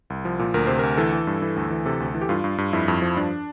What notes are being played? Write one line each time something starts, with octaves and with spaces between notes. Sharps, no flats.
C2
F3
A#2
D2 A#4
C3 C5
D2 A#4
E3 A4
E3
G2
E3
D2
E3
C3 A4
D2
E3
G4
G2 F4
G2
G2
F2 E4
F2
F3
G2 D4